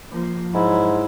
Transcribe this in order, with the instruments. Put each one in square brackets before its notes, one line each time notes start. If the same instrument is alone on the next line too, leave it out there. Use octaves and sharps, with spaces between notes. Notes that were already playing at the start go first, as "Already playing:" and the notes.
[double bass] F3 A#3
[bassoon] G#2 [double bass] F#3 E4